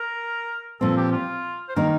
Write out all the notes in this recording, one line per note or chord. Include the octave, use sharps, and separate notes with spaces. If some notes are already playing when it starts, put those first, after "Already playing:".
Already playing: A#4
A#2 F3 C4 A4
G4
F4
C5
D#3 A#3 D#4 A#4